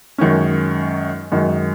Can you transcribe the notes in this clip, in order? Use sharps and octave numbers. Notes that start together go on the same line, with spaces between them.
F#2 D#3 G#3 C#4
F#2 D#3 G#3